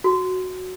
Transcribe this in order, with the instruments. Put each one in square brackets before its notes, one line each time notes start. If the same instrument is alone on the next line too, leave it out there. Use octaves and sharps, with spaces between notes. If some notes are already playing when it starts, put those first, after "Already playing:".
[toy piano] F#4